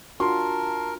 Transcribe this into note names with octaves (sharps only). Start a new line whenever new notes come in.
D4 F4 F#4 A#4 A5 C6